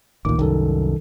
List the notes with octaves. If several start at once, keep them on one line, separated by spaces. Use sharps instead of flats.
A1 D2 A#2 D#3 D6
C2 F#2 D#3 A4